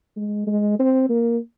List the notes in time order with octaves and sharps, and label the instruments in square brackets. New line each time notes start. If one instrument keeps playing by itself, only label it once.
[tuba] G#3
G#3
C4
A#3